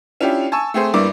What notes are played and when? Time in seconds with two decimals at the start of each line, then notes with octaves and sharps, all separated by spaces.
0.21 C#4 D4 E4 F4 G4
0.52 G#5 A5 C#6 E6
0.74 A3 C4 G#4 C5
0.94 G1 G2 A#3 E4 D5 D6